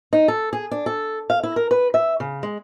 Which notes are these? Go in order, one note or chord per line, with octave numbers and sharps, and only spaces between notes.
D#4
A4
G#4
D4
A4
F5
E4
A#4
B4
E5
C#3
G#3